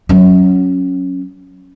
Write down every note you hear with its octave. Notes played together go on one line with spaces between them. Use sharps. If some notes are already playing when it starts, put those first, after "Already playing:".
F#3 C#4